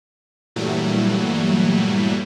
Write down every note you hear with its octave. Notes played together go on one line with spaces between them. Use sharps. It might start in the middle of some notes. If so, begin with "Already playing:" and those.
G2 A#2 E3 F#3 G3 A3